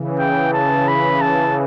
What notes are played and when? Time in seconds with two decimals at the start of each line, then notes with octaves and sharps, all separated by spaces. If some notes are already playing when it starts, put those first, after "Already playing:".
Already playing: C#3 E3
0.19 G5
0.53 A5
0.88 B5
1.21 A5